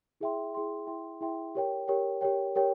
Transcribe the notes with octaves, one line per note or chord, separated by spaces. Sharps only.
E4 G#4 E5 G5 C6
E4 G#4 E5 G5 C6
E4 G#4 E5 G5 C6
E4 G#4 E5 G5 C6
G4 A#4 C#5 G5
G4 A#4 C#5 G5
G4 A#4 C#5 G5
G4 A#4 C#5 G5